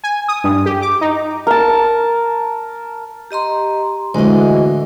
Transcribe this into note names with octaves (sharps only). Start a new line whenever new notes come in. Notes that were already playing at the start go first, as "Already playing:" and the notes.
G#5
D#6
G2
G4
D6
D#4
A#4 A5
G4 D#5 A#5 C6
D2 A2 E3 G#3 F#4 D#5